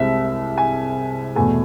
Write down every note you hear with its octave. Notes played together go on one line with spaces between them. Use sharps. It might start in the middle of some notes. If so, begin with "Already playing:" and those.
Already playing: C2 C3 G#3 E5
G#5
E2 B2 A3 G#5